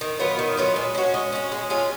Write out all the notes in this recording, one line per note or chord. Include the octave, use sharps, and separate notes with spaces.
D#3
F#3 B3 F4
D#3
F#3 B3 F4
G#3
C#4 F#4
G#3
C#4 F#4
G#3
C#4 F4 G#4